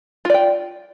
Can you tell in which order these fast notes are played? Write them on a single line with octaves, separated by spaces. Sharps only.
F4 D5 G5